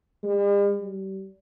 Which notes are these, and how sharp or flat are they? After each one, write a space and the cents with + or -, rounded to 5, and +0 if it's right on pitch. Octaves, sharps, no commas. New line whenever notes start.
G3 +45
G3 -35